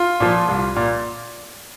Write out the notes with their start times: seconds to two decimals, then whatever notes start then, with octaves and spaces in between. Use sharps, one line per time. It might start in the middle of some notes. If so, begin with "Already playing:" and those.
Already playing: F4
0.20 A#2 F3
0.48 C2
0.76 A#2